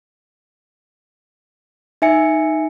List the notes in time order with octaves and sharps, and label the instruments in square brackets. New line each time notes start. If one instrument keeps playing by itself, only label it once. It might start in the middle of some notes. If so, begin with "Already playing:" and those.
[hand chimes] D#4 E5 G#5 C#7